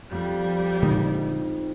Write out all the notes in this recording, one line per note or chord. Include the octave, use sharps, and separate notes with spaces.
F2 G3
A#2 D3 G#3 D#4